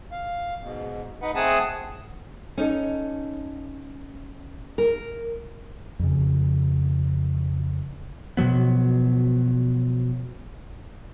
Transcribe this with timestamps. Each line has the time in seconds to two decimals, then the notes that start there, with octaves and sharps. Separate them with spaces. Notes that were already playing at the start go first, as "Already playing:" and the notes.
0.12 F5
0.63 G#2 B2
1.22 D#4 B4 F#5
1.35 A3 C4 G#4 F#5 A5 D#6
2.58 C#4 D#4 A4
4.78 A#4
5.99 F2 C#3
8.37 B2 F3 F#3 B3